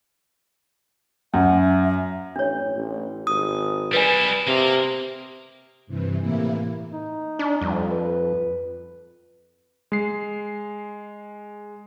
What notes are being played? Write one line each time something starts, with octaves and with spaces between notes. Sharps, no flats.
F#2 F#5
E5
A1 D4 C#5
A1
G#1 D#6
G3 E4 B4 D5 G#5
C3 A#3 F5
G2 C3 E3
A2 C3 E3 A#3 E4
D#4
D4
F2 G3
B4
G#3 C7